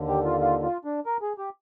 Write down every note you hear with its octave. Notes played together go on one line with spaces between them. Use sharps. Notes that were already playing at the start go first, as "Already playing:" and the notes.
Already playing: D#2 D3
G4
F4
F4
F4
D4
A#4
G#4
G4